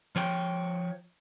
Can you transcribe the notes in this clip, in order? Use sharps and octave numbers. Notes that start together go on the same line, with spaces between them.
F3 C#5 G5